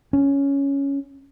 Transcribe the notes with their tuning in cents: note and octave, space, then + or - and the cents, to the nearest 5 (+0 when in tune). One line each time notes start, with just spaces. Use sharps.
C#4 +5